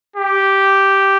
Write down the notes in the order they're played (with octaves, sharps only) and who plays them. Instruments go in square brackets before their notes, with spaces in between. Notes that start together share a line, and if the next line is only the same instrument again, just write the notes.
[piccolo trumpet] G4